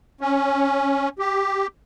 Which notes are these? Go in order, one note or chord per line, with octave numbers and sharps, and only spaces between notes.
C#4
G4